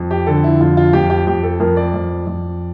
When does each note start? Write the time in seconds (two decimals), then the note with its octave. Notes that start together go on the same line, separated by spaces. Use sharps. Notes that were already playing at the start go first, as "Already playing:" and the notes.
Already playing: F2
0.11 G4
0.27 D3 A4
0.44 E4
0.60 F2 F4
0.77 F4
0.93 F2 G4
1.10 G4
1.27 F2 G4
1.43 A4
1.60 F2 A#4
1.77 D5
1.94 F2
2.27 F2